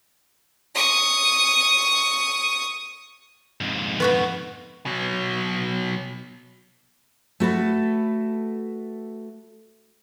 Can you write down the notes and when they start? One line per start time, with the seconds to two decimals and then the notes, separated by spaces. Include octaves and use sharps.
0.75 C#6 D#6
3.61 F2 G#2
4.00 B3 F#4 B4
4.86 B2 F#3
7.40 A3 F#4 A4 B4